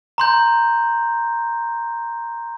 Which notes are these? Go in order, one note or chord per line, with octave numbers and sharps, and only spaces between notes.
A#5 C6 G6